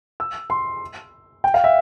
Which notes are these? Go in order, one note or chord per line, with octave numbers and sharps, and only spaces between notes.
E6
C6
G5
F5
E5